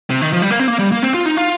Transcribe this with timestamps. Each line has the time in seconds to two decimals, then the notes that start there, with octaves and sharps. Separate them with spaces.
0.10 C3
0.21 D#3
0.33 F3
0.42 G3
0.50 A#3
0.59 C4
0.68 A#3
0.79 G3
0.92 A#3
1.03 C4
1.14 F4
1.26 D#4
1.37 F4